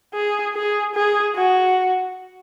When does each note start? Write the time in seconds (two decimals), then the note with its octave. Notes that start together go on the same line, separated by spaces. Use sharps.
0.14 G#4
0.55 G#4
0.95 G#4
1.35 F#4